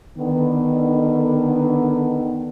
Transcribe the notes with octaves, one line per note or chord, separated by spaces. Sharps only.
D3 D#3 B3